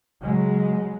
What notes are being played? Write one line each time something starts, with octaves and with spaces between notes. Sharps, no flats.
C#3 F#3 G#3